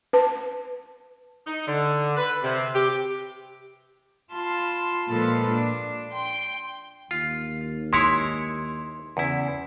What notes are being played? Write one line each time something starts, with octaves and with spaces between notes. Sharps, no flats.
B4 A5
D#4
D3
B4
C3
G4
F4 A5 B5 C6
A#2 F3 G#3 A4 B4 A6
D4
G5 C6
D#2 F4
G#3 E4 C#5 C6
E2 C#3 E4